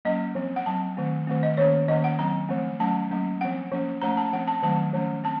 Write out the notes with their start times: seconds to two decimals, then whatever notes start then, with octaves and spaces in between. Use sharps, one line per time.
0.05 F#3 A#3 C#4 D#5
0.35 F3 C4
0.56 F#5
0.66 F#3 C4 A5
0.97 D#3 A3 C4
1.27 D#3 A3 C4
1.43 D#5
1.57 D#3 A#3 C#4 C#5
1.88 D#3 A#3 C#4 D#5
2.04 F#5
2.19 F#3 C4 A#5
2.49 F3 A3 C4
2.80 F#3 A3 C#4 A5
3.11 F#3 A#3 C#4
3.41 F3 C4 F#5
3.71 F3 A#3 C#4
4.01 F3 A3 C#4 A#5
4.17 A5
4.33 F3 C4 F#5
4.48 A5
4.63 D#3 F#3 A3 C4 A5
4.93 F3 A3 C#4
5.24 C4 A5